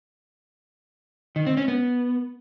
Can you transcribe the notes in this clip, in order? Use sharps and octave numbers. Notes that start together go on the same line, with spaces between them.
D#3
C4
C#4
B3